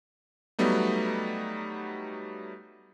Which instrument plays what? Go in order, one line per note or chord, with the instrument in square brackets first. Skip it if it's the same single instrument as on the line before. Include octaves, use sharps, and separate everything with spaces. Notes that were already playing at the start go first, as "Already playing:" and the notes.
[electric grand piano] F#3 G3 A3 B3 D#4